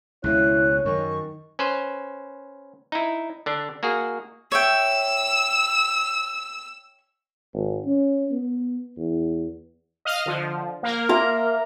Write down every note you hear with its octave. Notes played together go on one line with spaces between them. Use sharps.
C#2 B2 E4 C#5 F#6
F#2 D#3 C#6
C#4 B4 C5
D#4 E4
D3 D4
A#3 F#4 G#4
C#5 E5 G5 E6
G#1
C#4
B3
E2
D#5 F5 F6
D3 F3
A#3 A#4
E5 A#5 C6